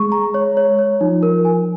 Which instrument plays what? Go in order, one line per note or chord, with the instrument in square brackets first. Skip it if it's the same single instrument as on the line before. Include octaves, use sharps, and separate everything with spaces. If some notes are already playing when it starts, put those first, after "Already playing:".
Already playing: [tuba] G#3 [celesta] C#6
[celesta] A#5
C#5
C#5
C#5
[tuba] F3 [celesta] D#4
[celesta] A#4
G#5